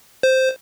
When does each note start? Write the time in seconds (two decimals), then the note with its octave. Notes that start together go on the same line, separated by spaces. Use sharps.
0.23 C5